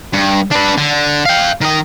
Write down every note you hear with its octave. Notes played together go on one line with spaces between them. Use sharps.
G2
D4 B4
D3
F5 G5
D#3 D#5